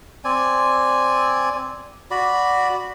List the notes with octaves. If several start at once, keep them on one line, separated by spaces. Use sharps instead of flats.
C4 D5 G#5
F#4 D5 B5